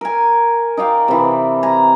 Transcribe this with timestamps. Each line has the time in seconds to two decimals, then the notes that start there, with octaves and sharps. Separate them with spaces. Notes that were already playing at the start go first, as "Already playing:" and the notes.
0.01 A#4 G#5
0.77 D#4 D5 F5 G5
1.08 C3 E3
1.63 G#5 A#5